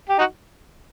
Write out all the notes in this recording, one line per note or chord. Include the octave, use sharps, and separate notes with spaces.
G4
D#4 F#4